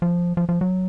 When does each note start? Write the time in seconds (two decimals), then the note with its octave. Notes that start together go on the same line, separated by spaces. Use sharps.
0.02 F3
0.37 F3
0.49 F3
0.61 F#3